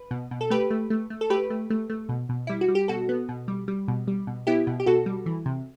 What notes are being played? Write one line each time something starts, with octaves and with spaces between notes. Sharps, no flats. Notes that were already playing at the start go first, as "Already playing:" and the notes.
Already playing: B4
B2
B2
A4
A3 G4 B4
A3
A3
A3
A4
A3 G4 B4
A3
A3
A3
B2
B2
G3 E4
F#4
G3
G4
B2 F#4 A4
B3
B2
G3
G3
B2
G3
B2
B3 E4 G4
B2
G4
B2 F#4 A4
G3
E3
C3